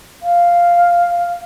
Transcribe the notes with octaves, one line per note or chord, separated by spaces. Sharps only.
F5